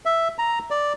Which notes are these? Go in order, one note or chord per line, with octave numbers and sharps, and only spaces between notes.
E5
A#5
D5